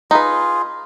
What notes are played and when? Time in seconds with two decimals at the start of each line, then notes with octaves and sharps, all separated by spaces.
0.11 D#4 F4 G#4 B4